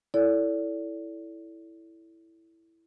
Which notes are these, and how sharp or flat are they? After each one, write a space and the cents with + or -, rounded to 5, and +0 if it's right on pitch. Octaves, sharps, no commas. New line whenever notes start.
E4 +0 A4 +0 D5 -35